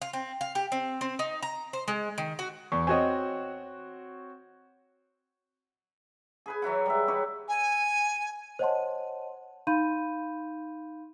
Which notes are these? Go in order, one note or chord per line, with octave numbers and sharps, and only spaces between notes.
F4
C4
F5
G4
C4
C4
D#4
A#5
C5
G#3
D#3
F#4
E2 C#6
C4 F#4 C#5 D#5 G#5
G#4 B4 G#5
E3 F#3 E4 F#5
G3 G#3 E5
D#4 G4 B4 C#5
G#5
C5 C#5 D#5 F#5 A5 C6
D#4 F5 B5 C6 G6 D#7